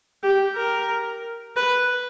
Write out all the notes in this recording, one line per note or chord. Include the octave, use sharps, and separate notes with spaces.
G4
A#4
B4